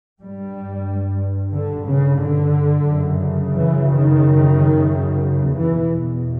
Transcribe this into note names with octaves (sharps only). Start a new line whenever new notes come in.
G2 G3
D3
C#3
D3
F#2 C#3
E3
D#3
E2 B2 E3